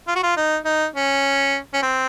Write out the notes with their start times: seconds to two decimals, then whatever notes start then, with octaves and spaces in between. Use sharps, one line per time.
0.08 F4
0.16 F#4
0.23 F4
0.37 D#4
0.65 D#4
0.96 C#4
1.74 C#4
1.83 C4